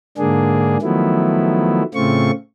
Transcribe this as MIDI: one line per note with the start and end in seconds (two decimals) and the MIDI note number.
0.18 0.77 44
0.18 0.77 50
0.18 0.77 58
0.18 0.77 62
0.18 0.77 68
0.82 1.83 51
0.82 1.83 53
0.82 1.83 54
0.82 1.83 57
0.82 1.83 59
0.82 1.83 64
1.94 2.31 45
1.94 2.31 49
1.94 2.31 57
1.94 2.31 60
1.94 2.31 65
1.94 2.31 85